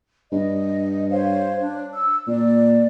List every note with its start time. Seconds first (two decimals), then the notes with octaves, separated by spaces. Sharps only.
0.32 G2 D#5
1.10 C5 C#5 F5
1.60 D4
1.93 E6
2.27 A#2 D5